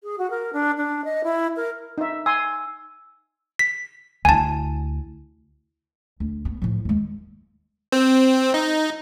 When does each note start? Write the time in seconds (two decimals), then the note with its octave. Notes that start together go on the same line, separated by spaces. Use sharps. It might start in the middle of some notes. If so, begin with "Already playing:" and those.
0.03 G#4
0.18 F#4
0.30 A#4
0.53 D4
0.77 D4
1.04 D#5
1.24 E4
1.57 A#4
1.98 D#4 E5
2.26 G#5 C6 E6
3.59 B6
4.25 D2 E4 G#5 A5
6.20 D2
6.45 B3
6.62 A2 F3
6.85 D#2 G#3
7.92 C4
8.54 D#4